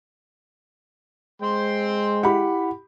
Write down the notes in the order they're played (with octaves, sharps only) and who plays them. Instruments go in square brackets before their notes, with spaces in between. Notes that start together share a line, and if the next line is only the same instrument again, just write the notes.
[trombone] G#3 [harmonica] C5 G5 C6
[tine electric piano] E4 F#5 [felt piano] G4 B5